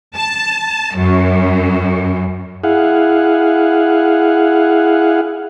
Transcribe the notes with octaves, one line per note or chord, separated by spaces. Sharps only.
A5
F#2
E4 G#4 F5 F#5